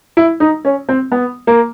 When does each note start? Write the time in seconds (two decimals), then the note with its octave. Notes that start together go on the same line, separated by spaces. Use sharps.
0.17 E4
0.40 D#4
0.65 C#4
0.89 C4
1.12 B3
1.47 A#3